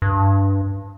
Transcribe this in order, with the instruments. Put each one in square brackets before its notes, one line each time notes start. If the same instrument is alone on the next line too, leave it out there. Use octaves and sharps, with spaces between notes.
[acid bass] G2